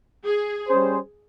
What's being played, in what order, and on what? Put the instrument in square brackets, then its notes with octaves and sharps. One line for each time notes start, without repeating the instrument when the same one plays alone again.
[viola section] G#4
[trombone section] G3 C#4 G#4 C5